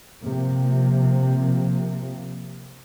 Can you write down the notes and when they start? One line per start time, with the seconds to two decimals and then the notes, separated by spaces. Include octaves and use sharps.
0.22 C3 F3 A#3